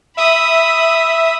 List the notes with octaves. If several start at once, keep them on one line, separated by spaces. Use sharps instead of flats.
E5 B5 D#6